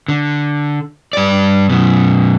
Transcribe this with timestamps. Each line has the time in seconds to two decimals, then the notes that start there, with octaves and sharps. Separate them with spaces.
0.08 D3
1.13 G2 D5
1.70 F#2 B2